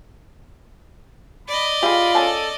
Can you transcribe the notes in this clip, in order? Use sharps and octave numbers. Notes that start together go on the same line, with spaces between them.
D5 D#5 B5
F4 G4 G#4 B5
C#3 A4 G#5 A5